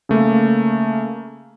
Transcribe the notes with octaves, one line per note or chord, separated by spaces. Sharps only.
C#3 A3 A#3